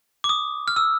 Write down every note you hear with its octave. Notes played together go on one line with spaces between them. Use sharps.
D6
D#6
F6
E6